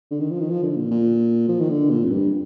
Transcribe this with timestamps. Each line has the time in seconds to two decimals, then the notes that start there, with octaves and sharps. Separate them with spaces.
0.11 D3
0.20 D#3
0.31 F3
0.40 D#3
0.50 F3
0.63 D3
0.77 A#2
0.91 A#2
1.49 F3
1.60 D#3
1.70 D3
1.91 A#2
2.04 F2
2.11 G2